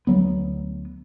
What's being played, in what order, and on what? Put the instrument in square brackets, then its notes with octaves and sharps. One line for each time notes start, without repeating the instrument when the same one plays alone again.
[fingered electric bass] D2 F#3 B3